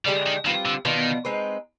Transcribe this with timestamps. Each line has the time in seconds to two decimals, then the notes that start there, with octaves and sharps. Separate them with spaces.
0.05 D3 G3 G#3 D4 G4
0.26 D#3
0.45 D#3 G3 C4 F4 B4
0.65 D3
0.85 B2 D#3 B3 D4 F4
1.25 G#3 C4 D#4 B4